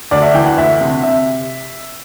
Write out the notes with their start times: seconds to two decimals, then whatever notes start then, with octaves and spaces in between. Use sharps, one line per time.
0.11 D2 D5
0.22 E5
0.34 E3 G5
0.46 F#5
0.57 D2 E5
0.81 C3
1.03 C3 E5